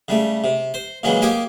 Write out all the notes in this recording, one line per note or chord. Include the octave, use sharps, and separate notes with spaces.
C#3 G3 A3
C3
C5
A#2 C#3 E3 F#3 G#3
A#3 G4 D#5 G5 G#5 D6